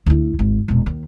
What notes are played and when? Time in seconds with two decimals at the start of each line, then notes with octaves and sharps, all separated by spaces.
0.06 D2 E4
0.39 G#1
0.68 E1 A#2
0.86 D#2